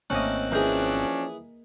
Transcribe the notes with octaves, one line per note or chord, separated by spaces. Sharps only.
G#1 A3 A#3 C4 C#4 D#5 F#6
E3 F3 C#4 D4 G#4 A#4 G6